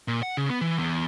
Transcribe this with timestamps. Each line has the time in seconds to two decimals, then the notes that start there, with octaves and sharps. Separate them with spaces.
0.08 A#2
0.23 F#5
0.37 C#3
0.50 B3
0.61 E3
0.79 E2